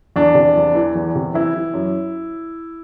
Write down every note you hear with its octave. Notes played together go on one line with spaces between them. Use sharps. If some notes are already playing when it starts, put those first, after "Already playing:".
E2 D4
C3
E2
E3
E2
C3
E3 E4
E3
F#2